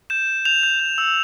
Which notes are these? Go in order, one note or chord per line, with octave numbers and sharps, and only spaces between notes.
G6 E7
G6
G6 F7
G6
G6
E6